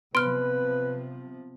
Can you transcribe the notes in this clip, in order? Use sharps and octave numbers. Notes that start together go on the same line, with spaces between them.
C3 F3 B3 B4 C6 F6